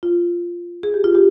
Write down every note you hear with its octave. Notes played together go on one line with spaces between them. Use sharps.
F4
G#4
G4
F4
G4